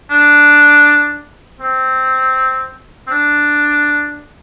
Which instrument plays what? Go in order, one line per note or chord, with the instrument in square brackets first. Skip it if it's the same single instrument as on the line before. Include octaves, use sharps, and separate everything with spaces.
[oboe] D4
C4
C4
D4